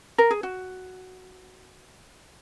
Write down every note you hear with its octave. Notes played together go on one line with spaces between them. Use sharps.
A#4
G#4
F#4